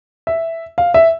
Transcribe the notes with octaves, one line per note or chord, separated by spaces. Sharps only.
E5
F5
E5